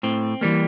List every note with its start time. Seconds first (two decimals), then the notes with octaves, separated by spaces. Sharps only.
0.03 A2 C4
0.41 E3 G3 A#3